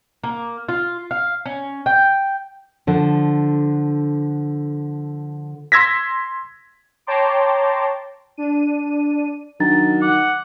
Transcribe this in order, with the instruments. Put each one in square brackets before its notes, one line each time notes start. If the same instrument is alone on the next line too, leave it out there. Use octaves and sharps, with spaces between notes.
[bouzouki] A#3
F4
F5
C#4
G5
[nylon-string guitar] D3 F3
[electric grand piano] C6 E6 G#6 A#6 B6
[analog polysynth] C#5 G5 A5 A#5 C6 D6
D4 D#7
[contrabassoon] D#3 [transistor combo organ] F#3 [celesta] D4 A#5 A6
[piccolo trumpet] F#5 [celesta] D6